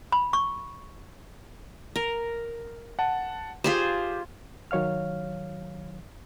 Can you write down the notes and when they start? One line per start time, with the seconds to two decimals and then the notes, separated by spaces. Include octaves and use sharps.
0.12 B5
0.33 C#6
1.96 A#4
2.99 F#5 A5
3.64 F4 G4 G#4 C5
4.71 D#3 F#3 C#5 F5 F6